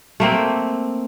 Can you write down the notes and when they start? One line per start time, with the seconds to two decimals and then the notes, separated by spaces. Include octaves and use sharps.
0.20 A3 A#3 C4